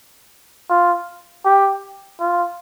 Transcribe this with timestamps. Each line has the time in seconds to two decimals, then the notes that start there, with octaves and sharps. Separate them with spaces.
0.70 F4
1.45 G4
2.20 F4